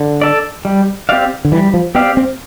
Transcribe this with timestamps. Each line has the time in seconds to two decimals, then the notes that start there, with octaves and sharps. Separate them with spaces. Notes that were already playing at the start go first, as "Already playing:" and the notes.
Already playing: D3
0.21 A4 D5
0.65 G3
1.09 C4 G4 D5 F5
1.45 D3
1.52 E3 G3
1.74 F3
1.95 B3 C4 G4 D5 F5
2.17 C4